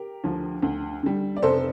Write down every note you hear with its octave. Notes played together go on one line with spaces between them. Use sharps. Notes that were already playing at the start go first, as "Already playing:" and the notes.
Already playing: G4 A#4
D2 D3 F3
D2
D3 G3
D5
F1 A4 C5